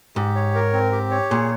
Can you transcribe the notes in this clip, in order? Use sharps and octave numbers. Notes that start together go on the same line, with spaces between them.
G#2 G4
C#5
A#4
C4
G4
C#5
A#2 G#4